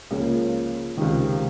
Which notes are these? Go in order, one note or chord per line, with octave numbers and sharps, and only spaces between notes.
C#2 C#3 F3 A#3
C#2 C3 D#3